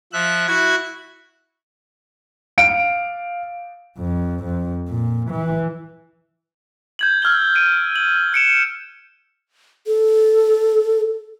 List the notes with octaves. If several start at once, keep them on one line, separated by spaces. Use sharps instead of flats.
F3 E5 F#6
E4 F#4 F#6 G#6
F5 D7
F2
F2
A#2
E3
G6 G#6 F#7
E6 F6 G#6 G7
D7 D#7
F#7
F#6 C#7 D7 E7
A4